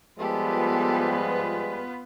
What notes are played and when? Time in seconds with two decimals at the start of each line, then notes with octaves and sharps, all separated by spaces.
0.19 F3 G3 G#3 B3 F4 G4 A4 B4